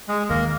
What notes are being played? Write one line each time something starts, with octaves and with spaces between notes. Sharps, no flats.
G#3 G#4
D#2 D#3 G#3 A#3 A#4